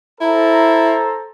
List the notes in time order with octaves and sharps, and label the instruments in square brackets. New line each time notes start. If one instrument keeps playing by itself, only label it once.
[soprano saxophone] E4 [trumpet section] A4 C5 A#5